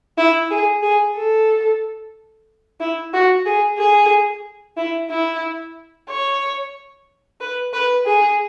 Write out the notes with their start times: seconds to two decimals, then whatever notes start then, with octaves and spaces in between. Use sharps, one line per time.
0.18 E4
0.51 G#4
0.83 G#4
1.15 A4
2.80 E4
3.14 F#4
3.46 G#4
3.78 G#4
4.77 E4
5.10 E4
6.09 C#5
7.41 B4
7.73 B4
8.06 G#4